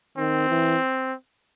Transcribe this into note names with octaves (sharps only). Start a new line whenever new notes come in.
D#3 C4
E3